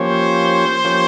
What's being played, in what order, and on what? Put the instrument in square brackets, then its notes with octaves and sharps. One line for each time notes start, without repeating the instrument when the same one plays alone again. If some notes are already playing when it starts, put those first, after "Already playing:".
Already playing: [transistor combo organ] F3 A#3 C#4 G4 C#5 [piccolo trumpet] C5
[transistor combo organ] F3 A#3 C#4 G4 C#5